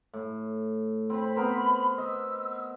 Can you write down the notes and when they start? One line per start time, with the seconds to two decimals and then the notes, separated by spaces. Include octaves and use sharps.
0.13 A2
1.10 C4 B5
1.36 B3 A#4 C5
1.98 D#5 E6